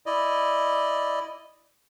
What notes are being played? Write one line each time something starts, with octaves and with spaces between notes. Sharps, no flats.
E4 D5 D#5